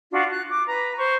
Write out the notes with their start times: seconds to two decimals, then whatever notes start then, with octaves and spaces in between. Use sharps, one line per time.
0.11 D4 F4 F#4
0.31 F#6
0.50 D6
0.67 B4 A#5
0.98 C5 C#6